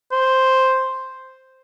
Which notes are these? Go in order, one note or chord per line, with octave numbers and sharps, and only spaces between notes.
C5